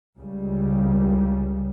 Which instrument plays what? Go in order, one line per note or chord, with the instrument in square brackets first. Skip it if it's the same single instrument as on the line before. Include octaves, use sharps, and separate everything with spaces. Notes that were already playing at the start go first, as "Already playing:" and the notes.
[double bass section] C#2 C#3 G3